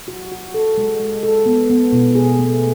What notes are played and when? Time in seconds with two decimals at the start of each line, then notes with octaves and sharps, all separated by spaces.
0.08 F#4
0.32 F#4
0.54 A4
0.78 G#3
1.00 G#3
1.23 A4
1.46 B3
1.70 B3
1.93 B2
2.15 G#4
2.39 A3